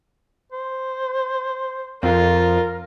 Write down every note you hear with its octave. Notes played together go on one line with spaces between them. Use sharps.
C5
F2 F4 A#4